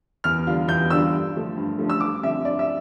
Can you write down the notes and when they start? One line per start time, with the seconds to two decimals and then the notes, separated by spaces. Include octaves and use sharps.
0.24 E2 F6
0.47 D3 G3 D4 F4
0.68 E2 G6
0.90 D3 G3 D4 F4 E6
1.12 G2
1.34 D3 F3 A3
1.57 G2
1.79 D3 F3 A3
1.89 E6
2.01 G2 D6
2.22 D3 F3 C4 E5
2.45 G2 D5
2.59 E5